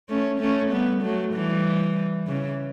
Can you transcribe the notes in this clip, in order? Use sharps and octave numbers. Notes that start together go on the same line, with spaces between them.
A3 C#4
A3 C#4
G3 B3
F#3 A3
E3 G3
C#3 E3